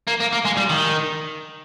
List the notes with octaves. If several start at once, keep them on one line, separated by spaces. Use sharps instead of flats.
A#3
A#3
A#3
G#3
G3
D#3